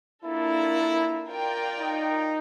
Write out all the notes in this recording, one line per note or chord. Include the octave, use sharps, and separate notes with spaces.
A#3 D4 E4 F4 A4
F4 A#4 D5 G5
D#4